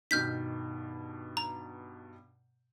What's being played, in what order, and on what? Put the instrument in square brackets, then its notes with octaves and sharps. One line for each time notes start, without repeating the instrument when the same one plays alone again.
[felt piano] G2 B2 D#3 [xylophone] F6 G6 B6
[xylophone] A#5